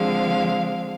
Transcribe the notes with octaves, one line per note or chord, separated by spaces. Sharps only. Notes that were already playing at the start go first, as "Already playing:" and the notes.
Already playing: D3 F3 G#3 C4 F5